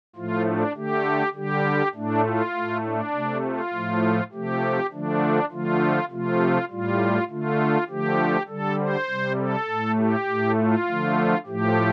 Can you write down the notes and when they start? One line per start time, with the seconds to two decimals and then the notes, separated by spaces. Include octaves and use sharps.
0.16 A2 F3 A3 F4
0.46 D4
0.75 D3 A3 G4
1.34 D3 G3 G4
1.94 A2 A3 D4
2.24 F4
2.53 A2 A3
2.84 D4
3.13 C3 A3
3.43 F4
3.73 A2 F3 A3
4.32 C3 F3 A3 G4
4.92 D3 F3 A3 D4
5.51 D3 F3 A3 F4
6.10 C3 F3 A3 F4
6.70 A2 G3 F4
7.30 D3 A3 F4
7.89 D3 F3 A3 G4
8.48 D3 G3 A4
8.79 C5
9.09 C3 G3
9.38 A4
9.68 A2 A3
9.98 G4
10.28 A2 A3
10.58 F4
10.87 D3 F3 A3
11.46 A2 F3 A3 G4